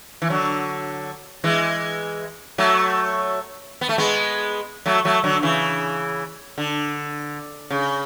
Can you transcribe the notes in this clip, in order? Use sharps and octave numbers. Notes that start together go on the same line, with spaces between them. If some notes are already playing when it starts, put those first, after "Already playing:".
E3
D3 F#3
E3 G#3
F#3 A3
B3
A3
G#3 B3
F#3 A3
F#3 A3
D3 F#3
C#3 E3
D3
C#3